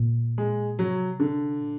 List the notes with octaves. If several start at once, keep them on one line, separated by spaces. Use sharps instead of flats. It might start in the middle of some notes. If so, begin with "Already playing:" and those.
Already playing: A#2
G#3
C3 F#3
D3
A#2